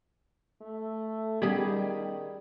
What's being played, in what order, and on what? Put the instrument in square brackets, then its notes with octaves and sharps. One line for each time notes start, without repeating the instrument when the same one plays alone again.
[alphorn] A3
[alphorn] D#3 [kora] G3 [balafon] B3 C#4 [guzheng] G#4 D#5 B5